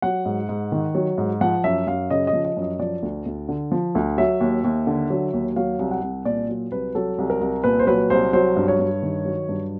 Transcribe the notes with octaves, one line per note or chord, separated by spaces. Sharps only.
F#3 F#5
G#2
G#2
D#3
F#3
G#2
F3 F#5
F#2 E5
F#2 F5
C#3 D#5
D#5
F3
D#5
F#2
D#5
F3 D5
D2
D2
D3
F3
D2
F#3 E5
D#2
D#2
D3
F#3
D#2
F#3 F5
C2
F#5
C2
A#2 D5
F#3
C2 B4
F#3 A4
C2
A#4
C2
A#2 B4
C5
F#3 B4
C2 C5
F#3 C5
G2
C#5
G2
D#3
F#3
G2